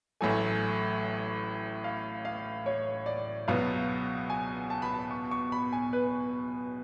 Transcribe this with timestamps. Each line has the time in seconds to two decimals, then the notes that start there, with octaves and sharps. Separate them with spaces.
0.21 A1 A2 F#3 A3 G#5
1.84 F5
2.25 F5
2.66 C#5
3.06 D5
3.48 C#2 B2 F#3 B3 F5
4.30 G#5
4.70 A5
4.82 B5
4.94 A5
5.11 C#6
5.31 C#6
5.52 B5
5.72 G#5
5.93 B4